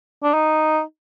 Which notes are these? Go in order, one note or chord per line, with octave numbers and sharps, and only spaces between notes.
D4
D#4